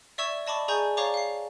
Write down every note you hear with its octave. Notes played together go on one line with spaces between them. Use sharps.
D5 E5 C#6 E6 G#6 E7
D5 D#5 A5 B5 C#6 D6
G#4 D5 G#5 A#5 C#6 G6
C#5 D5 F5 A#5 C#6 D6
F5 C7